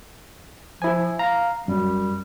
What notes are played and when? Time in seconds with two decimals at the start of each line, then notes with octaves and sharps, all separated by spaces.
0.82 F3 E4 G#5
1.19 F5 A#5
1.68 F#2 G3